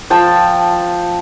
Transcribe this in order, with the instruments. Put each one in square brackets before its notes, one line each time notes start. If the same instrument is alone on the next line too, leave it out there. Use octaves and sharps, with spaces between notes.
[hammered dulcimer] F3 G5 A5